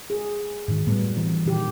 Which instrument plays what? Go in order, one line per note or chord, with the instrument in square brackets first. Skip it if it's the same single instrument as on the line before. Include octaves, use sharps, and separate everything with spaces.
[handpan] G#4
[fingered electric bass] G#2 D#3
[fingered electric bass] A2 [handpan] F#3 G3 B3
[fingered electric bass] E3 C4
[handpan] A#2 D#3 G4